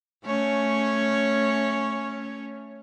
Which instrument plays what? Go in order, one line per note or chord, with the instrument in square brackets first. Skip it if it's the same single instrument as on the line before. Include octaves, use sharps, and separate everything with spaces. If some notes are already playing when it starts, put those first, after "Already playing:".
[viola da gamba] A3 C#4 C#5